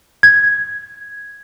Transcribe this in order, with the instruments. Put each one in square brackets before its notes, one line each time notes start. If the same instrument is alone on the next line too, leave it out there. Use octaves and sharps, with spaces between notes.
[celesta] G#6